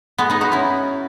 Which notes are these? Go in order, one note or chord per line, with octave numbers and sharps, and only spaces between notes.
G#3 B3
B3 D#4
D#4 F#4
C#4 E4